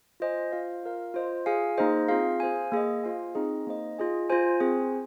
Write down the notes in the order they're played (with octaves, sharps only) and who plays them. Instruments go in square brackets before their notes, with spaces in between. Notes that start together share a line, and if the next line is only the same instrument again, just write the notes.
[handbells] F4 C5 D#5 G#5
F4 C5 F5
F4 A#4 F5
F4 C5 D#5
F4 G#4 F5 G#5
A#3 D#4 G#4 C5 D#5
C4 F4 G#4 F5
G#4 C5 F5 G#5
A#3 G#4 D#5
F4 C5 F5 G#5
C4 D#4 G#4 D#5
A#3 D#4 C5 D#5
F4 G#4 D#5 G#5
F4 C5 G#5
C4 G#4 C5 G#5